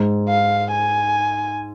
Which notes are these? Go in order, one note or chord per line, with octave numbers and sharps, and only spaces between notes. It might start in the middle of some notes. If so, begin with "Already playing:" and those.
Already playing: G#2
F5
G#5